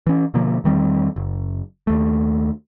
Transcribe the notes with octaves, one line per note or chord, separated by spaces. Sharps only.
E3 C#4
B2 D3 F3 A#3
E2 D#3 G3 C4
F#1
D#2 A3